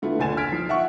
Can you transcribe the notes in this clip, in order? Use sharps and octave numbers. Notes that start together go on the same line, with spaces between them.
D3 A3 B3 E4 F4
F#1 D2 G#5 A6 E7
F6 G#6 B6 D7
F3 D#4 C7
E5 F#5 C#6